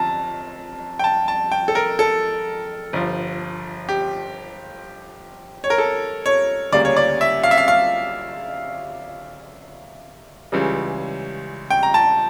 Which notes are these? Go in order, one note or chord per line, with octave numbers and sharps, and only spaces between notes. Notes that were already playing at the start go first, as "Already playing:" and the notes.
Already playing: G1 F2 A5 A#5
G5
A5
A5
G5
A4
A#4
A4
G1 G2 F3
G4
C#5
A#4
A4
C#5
D2 C#3 G3 A#3 D5
C#5
D5
E5
F5
E5
F5
F5
C#2 C#3 E3 G3
G5
A#5
A5